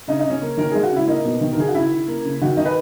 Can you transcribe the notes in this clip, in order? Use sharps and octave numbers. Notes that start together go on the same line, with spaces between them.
C#3 D#4
D#4
C#3
C#4
A#3
D#3 A#4
G#3 G#4
F#4
C#3 E4
A#3 D#4
B2
D#3
A#4
D#3 G#4
F#4
C#3 E4
C#3
A#3
C#3
D#3 F#4
D#3 D#4
B4